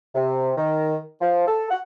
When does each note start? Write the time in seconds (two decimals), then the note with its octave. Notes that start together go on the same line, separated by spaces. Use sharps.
0.15 C3
0.58 D#3
1.21 F3
1.48 A4
1.71 F#5